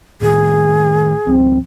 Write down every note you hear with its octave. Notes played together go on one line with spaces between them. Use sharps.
A2 D#3 G#4
G#1 C#2 F3 C4